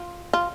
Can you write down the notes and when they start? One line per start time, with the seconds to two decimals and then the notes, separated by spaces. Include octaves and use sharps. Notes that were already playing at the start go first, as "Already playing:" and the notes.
Already playing: F4
0.33 F4